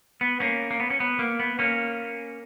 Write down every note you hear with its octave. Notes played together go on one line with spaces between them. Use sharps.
B3
A#3 C#4
A#3
B3
C#4
B3
A#3
B3
A#3 C#4